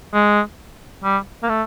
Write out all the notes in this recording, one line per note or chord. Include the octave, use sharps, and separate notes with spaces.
G#3
G3
A#3
A3